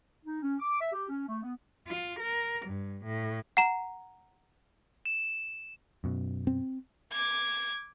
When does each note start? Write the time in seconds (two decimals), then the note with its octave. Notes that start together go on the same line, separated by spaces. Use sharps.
0.25 D#4
0.42 C#4
0.59 D6
0.80 E5
0.92 G4
1.09 C#4
1.28 A3
1.42 B3
1.88 F4
2.19 A#4
2.66 G2
3.05 A2
3.57 F#5 A#5
5.06 E7
6.04 F#2 B2
6.47 C4
7.12 D6 G#6